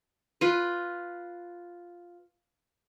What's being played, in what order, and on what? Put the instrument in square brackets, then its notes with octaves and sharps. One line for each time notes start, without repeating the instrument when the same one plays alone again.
[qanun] F4 B4